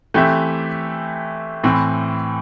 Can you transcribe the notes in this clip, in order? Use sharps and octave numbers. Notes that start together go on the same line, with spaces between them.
E3 A3 C4 G4 E5
A2 E3 C4